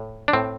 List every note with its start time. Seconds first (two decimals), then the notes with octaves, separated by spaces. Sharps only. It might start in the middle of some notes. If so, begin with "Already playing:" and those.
Already playing: A2
0.28 D4
0.33 A2 C4